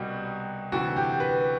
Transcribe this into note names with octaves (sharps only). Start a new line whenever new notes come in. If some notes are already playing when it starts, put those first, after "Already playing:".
Already playing: C2 B2 G3 F#4
D2 C3 E3 F#4
G4
B4